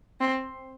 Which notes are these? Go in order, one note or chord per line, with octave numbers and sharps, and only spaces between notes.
C4